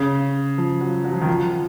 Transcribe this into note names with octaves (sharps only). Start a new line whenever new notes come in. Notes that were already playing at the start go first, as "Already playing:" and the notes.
Already playing: C#3
F3
F#3
F#3
F3
D#3
F3